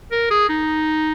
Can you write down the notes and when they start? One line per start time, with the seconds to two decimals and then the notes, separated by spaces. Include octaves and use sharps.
0.11 A#4
0.31 G#4
0.49 D#4